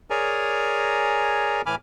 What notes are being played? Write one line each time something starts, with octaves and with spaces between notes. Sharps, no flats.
G#4 A#4 C#5 D5 G#5 A#5
A2 E3 G#5 B5 D6 F6